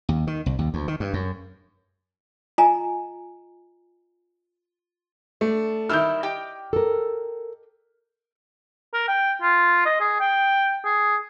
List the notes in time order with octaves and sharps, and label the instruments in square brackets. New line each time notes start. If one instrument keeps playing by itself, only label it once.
[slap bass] D#2
D#3
C2
D#2
D2
D#3
G2
F#2
[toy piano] F4 D#5 G#5 A#5
[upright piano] A3 [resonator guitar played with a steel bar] D4
[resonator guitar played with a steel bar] D#3 G3 E4 [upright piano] F6 G6
[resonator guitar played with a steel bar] G4 D#5 G5
[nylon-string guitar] A4 A#4
[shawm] A#4
G5
F4
D#5
G#4
G5
G#4